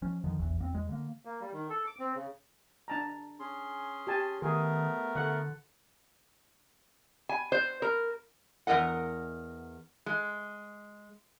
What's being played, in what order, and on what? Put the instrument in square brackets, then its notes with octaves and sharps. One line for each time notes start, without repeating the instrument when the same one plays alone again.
[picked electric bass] F3 C#4
F2 D3 D#3 F3
F1 A#1 E2 E3
E2 A#3 C4
E2 G#3
D3 A#3
[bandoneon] A#3
G3
D#3
A4
D6
C4
C#3
[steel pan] D4 A5 A#5
[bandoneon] C#4 G#4 C6
[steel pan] G4 G#5 A5
[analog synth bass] D#3 [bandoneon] A3 B3 A#4 [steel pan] G#4
[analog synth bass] D3 [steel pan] A4 F#5
[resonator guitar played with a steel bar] G#5
C5
A#4
E2 G#2 A#4 D#5 F#5
G#3